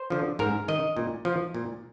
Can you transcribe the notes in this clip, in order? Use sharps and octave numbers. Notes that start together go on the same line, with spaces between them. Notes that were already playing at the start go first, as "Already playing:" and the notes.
Already playing: C5
D3 F3
G#2 A#4
D#3 D#5
A#2
F3
A#2